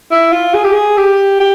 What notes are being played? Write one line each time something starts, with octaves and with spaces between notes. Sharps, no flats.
E4
F4
G#4
G4
G#4
G4
G4